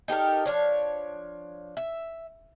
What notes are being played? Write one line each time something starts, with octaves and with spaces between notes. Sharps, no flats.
D#4 G4 A4 A#4
F3 D4 C#5
E5